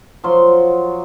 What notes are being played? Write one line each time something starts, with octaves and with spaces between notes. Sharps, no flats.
F3 F#3 F4 C6